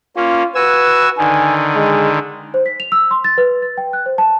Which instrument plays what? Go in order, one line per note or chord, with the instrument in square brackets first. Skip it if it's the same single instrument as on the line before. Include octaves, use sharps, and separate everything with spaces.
[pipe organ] A#3 C#4 [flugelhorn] F4
[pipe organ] F#4 G#5 E6 [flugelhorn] B4
[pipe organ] D3 D#3 [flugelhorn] G#5
[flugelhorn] G#3
[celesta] C5
B6
F7
E6
C6
A6
B4
A6
G5
F#6
C5
A5